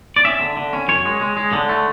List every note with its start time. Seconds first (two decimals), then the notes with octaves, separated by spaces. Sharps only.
0.16 D5
0.25 C#4 E5
0.41 D3
0.57 D3
0.73 C#4
0.88 F#2 C#5
1.05 G#3
1.21 G#3
1.37 G#3
1.53 D3
1.69 A3